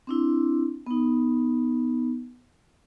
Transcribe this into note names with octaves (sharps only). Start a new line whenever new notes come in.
C4 D4 E4
B3 D#4